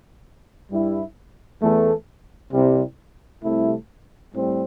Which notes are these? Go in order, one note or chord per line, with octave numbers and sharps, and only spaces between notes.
G2 G3 E4
E2 E3 A3
C2 C3 G3
C2 C3 A3 E4
A2 G3 C4